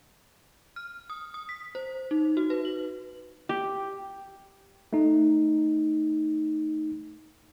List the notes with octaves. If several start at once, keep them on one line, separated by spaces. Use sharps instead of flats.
F6
D#6
D#6
B6
C5
D#4
F#4
B4
F#7
G4
A3 D#4